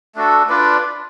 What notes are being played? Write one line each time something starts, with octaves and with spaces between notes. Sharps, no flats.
A3 D4 F#4 A4
D4 F4 B4 D5